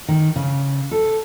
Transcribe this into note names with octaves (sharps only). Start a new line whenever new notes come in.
D#3
C#3
A4